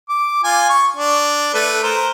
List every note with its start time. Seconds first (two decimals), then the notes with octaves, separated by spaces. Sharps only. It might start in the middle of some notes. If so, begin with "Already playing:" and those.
0.09 D6
0.44 F4 G#5
0.69 C#6
0.96 D4
1.54 A3 A4 B4
1.83 A#4 C5